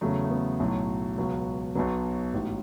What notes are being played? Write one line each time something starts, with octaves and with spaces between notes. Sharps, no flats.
E2 C#3 F#3 A3
A3
B3
B1 A2 F#3
C#2 B2 F#3
B1 B2 F#3 B3
A1 G#2 F#3